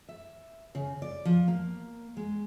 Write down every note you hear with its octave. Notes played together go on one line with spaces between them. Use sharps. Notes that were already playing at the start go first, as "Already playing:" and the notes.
E5
C#3
D5
F3
A#3
G#3